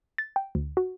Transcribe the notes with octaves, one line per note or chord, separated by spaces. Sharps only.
A6
G5
D2
F#4